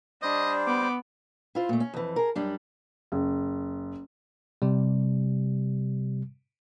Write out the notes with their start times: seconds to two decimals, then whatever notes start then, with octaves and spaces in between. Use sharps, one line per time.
0.22 G3 D4 C5 D#5
0.67 B3 D6
1.55 E4 F4 C5
1.69 A#2 A3
1.80 C#4
1.94 F2 E3
2.16 G#4 A#4
2.35 F#2 G3 D4
3.12 F#1
4.62 C3 G3